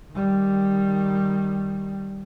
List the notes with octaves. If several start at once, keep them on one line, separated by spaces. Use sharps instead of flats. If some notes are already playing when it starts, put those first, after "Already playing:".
D#3 G3